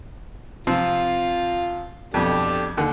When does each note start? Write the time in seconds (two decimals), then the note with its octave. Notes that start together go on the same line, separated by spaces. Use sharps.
0.67 C3 F3 C4 F4
2.14 F2 B2 D4 G4 A4
2.77 D#2 D3